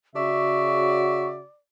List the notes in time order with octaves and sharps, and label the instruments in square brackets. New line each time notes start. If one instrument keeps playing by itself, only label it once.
[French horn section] C#3 F#4 [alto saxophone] D5 [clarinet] E5 [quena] C#6